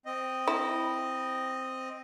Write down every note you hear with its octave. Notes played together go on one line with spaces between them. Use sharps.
C4 D#5
E4